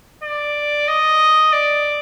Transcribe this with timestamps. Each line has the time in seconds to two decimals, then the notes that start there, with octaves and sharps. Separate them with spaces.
0.23 D5
0.88 D#5
1.52 D5